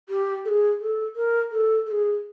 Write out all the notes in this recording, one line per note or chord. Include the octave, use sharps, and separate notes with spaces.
G4
A4
G#4
A4
A#4
A4
A4
G#4